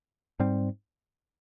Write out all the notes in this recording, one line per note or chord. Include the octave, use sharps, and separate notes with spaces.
G#2 G3 C4